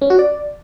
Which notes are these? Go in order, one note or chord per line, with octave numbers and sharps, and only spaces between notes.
C#4
F#4
D5